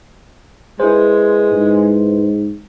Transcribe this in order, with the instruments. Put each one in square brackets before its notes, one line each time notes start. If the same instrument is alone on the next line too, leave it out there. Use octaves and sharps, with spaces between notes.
[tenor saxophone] G#3 [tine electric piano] E4 B4 C5
[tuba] G#2